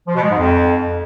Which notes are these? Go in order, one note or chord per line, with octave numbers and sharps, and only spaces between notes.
F3
B2
G#3
G#2
F2